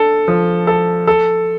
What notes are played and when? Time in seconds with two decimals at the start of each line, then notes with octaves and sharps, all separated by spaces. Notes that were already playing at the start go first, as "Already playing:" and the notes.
Already playing: D4 A4
0.28 F3
0.67 A4
1.07 A4